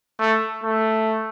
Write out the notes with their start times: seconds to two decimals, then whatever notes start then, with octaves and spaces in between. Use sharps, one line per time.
0.20 A3
0.64 A3